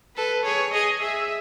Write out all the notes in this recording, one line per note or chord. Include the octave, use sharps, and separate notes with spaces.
A4 B4
G#4 C#5
G#4 D#5
G#4 E5